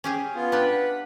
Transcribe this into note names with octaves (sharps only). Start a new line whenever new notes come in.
C#4 G4 G#4
B3 F4
D4 G4 B4
F#5